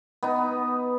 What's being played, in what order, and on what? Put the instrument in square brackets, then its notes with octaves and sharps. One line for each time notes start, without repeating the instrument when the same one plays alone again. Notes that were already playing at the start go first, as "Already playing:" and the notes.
[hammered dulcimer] B3 D#4